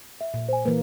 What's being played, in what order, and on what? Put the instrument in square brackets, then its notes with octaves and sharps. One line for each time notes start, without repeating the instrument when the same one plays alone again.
[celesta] E5
[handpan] A#2
[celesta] C5 G#5
[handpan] E3 A#3 [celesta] B4